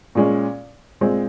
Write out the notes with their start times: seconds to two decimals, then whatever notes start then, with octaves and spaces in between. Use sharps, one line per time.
0.15 A#2 G#3 C#4
1.01 A#2 G#3 C4